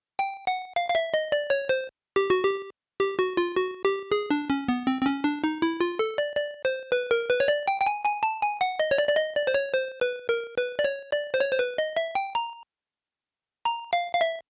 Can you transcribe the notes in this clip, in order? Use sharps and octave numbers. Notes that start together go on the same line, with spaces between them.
G5
F#5
F5
F5
E5
D#5
D5
C#5
C5
G4
F#4
G4
G4
F#4
F4
F#4
G4
G#4
D4
C#4
B3
C4
C4
C#4
D4
D#4
E4
F4
A4
D5
D5
C5
B4
A#4
B4
C#5
D5
G5
G5
G#5
G#5
A5
G#5
F#5
D#5
C#5
D5
D5
D#5
D5
C5
C#5
C5
B4
A#4
B4
D5
C#5
D5
C5
C#5
C5
B4
D#5
E5
G5
A#5
A#5
F5
F5
E5